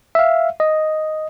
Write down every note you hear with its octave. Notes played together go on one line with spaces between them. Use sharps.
E5 F5
D#5